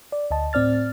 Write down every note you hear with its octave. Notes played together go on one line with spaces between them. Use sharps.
D5
D2 D#5 A5
A2 C4 D5 F6 A6